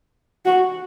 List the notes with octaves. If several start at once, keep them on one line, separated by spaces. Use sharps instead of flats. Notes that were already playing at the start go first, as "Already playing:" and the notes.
F#4